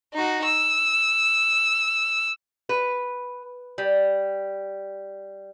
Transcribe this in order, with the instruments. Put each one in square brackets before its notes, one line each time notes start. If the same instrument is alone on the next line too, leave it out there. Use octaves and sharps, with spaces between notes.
[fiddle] D#4 F#4
E6
[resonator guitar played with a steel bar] B4
G3